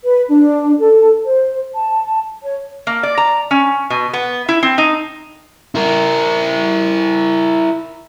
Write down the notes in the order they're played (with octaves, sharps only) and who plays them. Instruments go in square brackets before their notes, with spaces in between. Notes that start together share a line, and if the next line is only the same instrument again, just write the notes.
[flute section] B4
D4
A4
C5
A5
C#5
[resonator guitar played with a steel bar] A#3
D5
A#5
C#4
B2
B3
E4
C4
D#4
[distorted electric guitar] E4 A#4